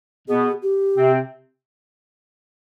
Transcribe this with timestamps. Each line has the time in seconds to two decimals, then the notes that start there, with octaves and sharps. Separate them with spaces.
0.28 B2 B3 G#4
0.62 G4
0.97 C3 C4